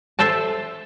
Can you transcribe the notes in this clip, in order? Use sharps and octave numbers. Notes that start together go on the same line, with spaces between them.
A4 C5 E5 A5